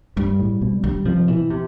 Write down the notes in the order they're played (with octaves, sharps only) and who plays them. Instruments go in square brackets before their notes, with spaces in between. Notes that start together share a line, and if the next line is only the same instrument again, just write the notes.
[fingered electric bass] G2 [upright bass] G3
[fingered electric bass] A2
B2
[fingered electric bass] D3 [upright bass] G3
[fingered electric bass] C3 [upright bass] F3
[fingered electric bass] B2 [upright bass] E3
[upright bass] C3